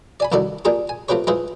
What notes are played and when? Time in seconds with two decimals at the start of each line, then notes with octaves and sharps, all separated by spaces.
0.20 D5 G#5 B5
0.32 C2 D#3 E4 F#4 A4 D5
0.65 A#3 D4 F4 G4 G#4
0.89 G#5
1.09 A3 C4 F4 G4 B4 C#5
1.27 G#3 E4 F4 G#4 B4 C5